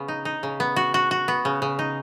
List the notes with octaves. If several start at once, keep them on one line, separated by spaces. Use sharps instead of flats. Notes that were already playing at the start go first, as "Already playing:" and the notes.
Already playing: C#3 B3
D#4
D#4
C#3
B3
F#4
F#4
F#4
B3
C#3
C#3
D#4